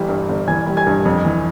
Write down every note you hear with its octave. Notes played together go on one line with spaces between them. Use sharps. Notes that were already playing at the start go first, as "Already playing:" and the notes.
Already playing: G1 E3 G3
G2
G1
E3 G#5 G#6
G3
G#5 G#6
G2
F2
E3